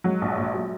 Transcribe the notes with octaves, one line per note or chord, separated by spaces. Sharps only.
F#3 G#3
A#1
A#1
F#3